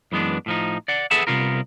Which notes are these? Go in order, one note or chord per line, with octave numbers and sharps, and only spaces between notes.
F#2 E3 G#3 B3 D4
A2 F3 D#4
D5 F#5
G#4 A4 B4 E5 F#5 A5
C2 G#2 C3 B3 F4 A#4